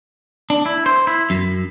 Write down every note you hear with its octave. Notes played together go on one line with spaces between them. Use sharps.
D4
E4
C5
E4
F#2